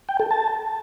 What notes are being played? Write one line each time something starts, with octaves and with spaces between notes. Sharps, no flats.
G5
A4
A5